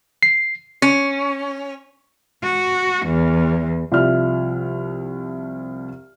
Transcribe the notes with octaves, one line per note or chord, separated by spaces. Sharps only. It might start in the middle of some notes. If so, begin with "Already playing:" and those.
C7
C#4
F#4
E2
C2 F3 D5 E5 F6